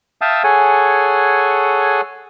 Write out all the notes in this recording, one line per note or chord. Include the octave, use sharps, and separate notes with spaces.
E5 F5 G5 A5 D#6 E6
G#4 A4 C#5 F#5 G#5